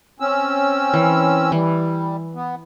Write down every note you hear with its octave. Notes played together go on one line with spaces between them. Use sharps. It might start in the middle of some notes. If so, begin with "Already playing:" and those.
C4 C#4 E6
E3
E3 G3
B3